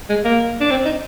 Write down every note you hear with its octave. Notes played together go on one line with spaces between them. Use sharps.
G#3
A#3
D4
C4
D#4